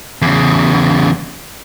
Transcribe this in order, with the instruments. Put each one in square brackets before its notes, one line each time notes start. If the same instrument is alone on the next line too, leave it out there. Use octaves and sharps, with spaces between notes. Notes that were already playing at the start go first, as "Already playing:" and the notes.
[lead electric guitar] E2 C#3